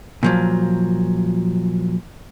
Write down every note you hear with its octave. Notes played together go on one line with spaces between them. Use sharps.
A#2 F3 F#3